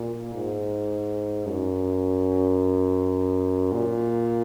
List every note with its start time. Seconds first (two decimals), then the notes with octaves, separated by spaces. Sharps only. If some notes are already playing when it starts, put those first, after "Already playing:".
Already playing: A#2
0.34 G#2
1.46 F#2
3.72 A#2